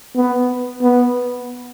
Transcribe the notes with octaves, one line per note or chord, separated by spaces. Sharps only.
B3
B3